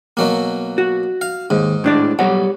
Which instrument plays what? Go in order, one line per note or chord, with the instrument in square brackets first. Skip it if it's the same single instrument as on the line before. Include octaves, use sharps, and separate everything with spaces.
[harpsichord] B2 F#3 A#3
[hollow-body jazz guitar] F#4
[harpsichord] F5
[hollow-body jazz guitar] D#2 [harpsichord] G#2
[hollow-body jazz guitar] A2 D4 D5
[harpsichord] B1 [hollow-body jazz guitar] G3 C#5 F#5